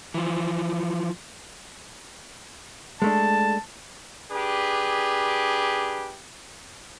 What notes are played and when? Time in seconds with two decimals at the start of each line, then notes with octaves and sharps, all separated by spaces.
0.14 E3 F3
3.02 G#3 A3 D4 A5
4.31 D4 G4 G#4 B4